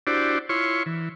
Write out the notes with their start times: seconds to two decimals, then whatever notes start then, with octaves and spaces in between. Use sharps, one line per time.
0.07 D4 E4 F#4 G4 C5 D5
0.49 E4 F4 C#5 C6 C#6
0.86 E3